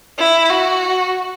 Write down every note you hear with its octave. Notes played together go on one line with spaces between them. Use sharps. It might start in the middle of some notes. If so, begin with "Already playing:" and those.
E4
F#4